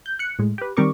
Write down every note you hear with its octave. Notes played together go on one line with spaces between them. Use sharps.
G6
F#6 C#7
A2 G#3
G4 B4
D#3 G3 C4 A#4 C#6 D6